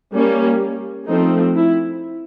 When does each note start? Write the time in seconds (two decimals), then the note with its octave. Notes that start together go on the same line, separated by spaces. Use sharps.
0.13 G3 A#3 C#4
1.08 F3 A3 C4 D#4
1.56 E4